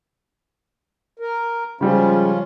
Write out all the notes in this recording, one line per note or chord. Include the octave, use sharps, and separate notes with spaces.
A#4
C#3 F3 G3 G#3 C#4 F4